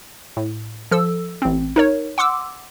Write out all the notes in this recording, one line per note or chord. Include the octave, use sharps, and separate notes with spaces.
A2
F3 A4 E6
A1 C4
D#4 A#4 C#5
F#5 C6 D6 E6